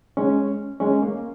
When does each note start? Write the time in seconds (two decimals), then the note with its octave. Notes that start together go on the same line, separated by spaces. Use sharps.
0.17 G#3 C#4
0.80 G#3 C#4
1.02 A#3